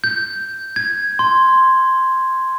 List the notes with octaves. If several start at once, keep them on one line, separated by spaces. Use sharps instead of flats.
G6
G#6
C6